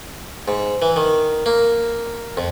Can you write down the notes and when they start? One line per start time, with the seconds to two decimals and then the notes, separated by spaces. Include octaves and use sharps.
0.48 G#2
0.82 E3
0.96 D#3
1.46 A#3
2.37 F2